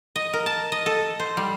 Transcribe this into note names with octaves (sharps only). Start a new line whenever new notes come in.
D#5
A#4
A5
D#5
A4
C5
G3